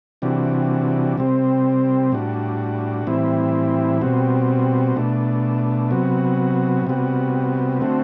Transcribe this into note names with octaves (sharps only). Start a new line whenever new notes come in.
C3 E3 G3 D4 F#4
C3 G3 C4
A2 G3 D4 F#4
A2 E3 G3 C4 E4
B2 G3 C4 F#4
B2 A3 D4
C3 F#3 B3 F#4
C3 G3 B3 F#4
D3 A3 C4 F#4